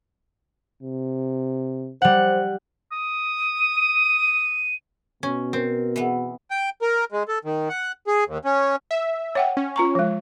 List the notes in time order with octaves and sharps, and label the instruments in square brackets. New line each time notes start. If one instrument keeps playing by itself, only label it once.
[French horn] C3
[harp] G3 F#5 [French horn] C5
[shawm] D#6
[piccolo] D#7
[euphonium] B2 [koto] C#4
[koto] C4 [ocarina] A#4
[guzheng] E3 B3
[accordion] G5
A#4
G#3
A4
D#3
F#5
G#4
D#2
C#4
[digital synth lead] E5
[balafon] C#5 F#5 G5
[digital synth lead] C#4
[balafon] F4 A#5 C#6
F3 G#3